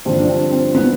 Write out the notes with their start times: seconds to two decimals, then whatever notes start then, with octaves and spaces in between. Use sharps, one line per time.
0.05 G2 D3 F3 C4
0.19 D4
0.29 C4
0.51 C4
0.75 B3